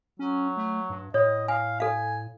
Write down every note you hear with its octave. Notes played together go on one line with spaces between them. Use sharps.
F#3 C#4
A3
G2
A2 C#5 D#5
F5 G#5
A4 F5 G#5